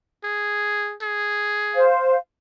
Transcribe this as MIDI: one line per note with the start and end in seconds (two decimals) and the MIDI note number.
0.24 0.95 68
1.02 1.87 68
1.74 2.16 72
1.74 2.16 77